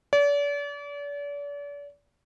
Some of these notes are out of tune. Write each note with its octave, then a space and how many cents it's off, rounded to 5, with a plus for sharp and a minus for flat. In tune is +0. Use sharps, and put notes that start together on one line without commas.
D5 -40